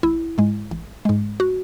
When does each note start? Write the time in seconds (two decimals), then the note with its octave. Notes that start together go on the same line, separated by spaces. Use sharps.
0.03 A1 E4
0.38 G#2 G#3
0.71 A1
1.05 G#2 G#3
1.40 F#4